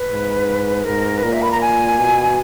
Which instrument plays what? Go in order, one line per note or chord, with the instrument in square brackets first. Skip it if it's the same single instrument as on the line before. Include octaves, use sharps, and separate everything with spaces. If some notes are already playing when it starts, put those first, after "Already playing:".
Already playing: [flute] B4
[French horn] G#2
[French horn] G#2 [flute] A#4
[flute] B4
[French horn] A#2 [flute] A#4
[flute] E5
B5
A#5
G#5
[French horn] B2